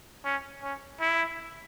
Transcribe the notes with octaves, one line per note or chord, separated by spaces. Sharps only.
C#4
C#4
E4